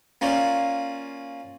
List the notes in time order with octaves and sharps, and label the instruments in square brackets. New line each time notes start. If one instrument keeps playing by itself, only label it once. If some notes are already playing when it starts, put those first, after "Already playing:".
[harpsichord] A#3 C#4 F4 D5